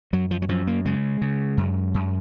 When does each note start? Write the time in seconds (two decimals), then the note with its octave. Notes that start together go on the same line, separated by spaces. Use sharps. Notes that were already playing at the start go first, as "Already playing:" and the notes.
0.13 F#2 F#3
0.31 F3
0.42 F#3
0.49 F#2 F3
0.67 A#3
0.85 C#3 G#3
1.22 C#3
1.57 F#2
1.94 F#2